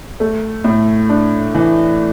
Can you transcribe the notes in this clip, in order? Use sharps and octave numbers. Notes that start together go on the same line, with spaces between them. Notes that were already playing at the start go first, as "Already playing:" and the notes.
A3
A2
D4
E3